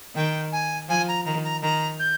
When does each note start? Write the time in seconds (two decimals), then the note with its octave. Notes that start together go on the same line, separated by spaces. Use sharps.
0.16 D#3 G5
0.52 G#5
0.89 F3 G#5
1.08 A#5
1.25 D#3 A#5
1.44 A#5
1.62 D#3 A#5
1.99 G6